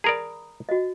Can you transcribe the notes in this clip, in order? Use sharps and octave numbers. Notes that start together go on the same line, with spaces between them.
G#4 A#4 D5 A#5 B5 D#6
F#4 D#5